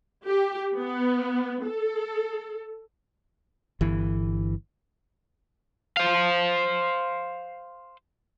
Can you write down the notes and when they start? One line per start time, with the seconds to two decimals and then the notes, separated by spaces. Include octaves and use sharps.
0.24 G4
0.75 B3
1.64 A4
3.81 G1 E3
5.97 C5 F5